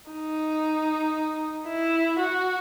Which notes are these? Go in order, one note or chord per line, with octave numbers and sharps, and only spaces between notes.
D#4
E4
F#4